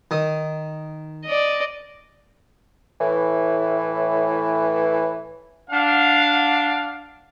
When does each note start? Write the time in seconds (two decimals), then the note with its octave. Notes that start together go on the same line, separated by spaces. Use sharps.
0.11 D#3 D#6
1.25 D5 D#5
3.01 A2 E3
5.70 D4 F5 F#5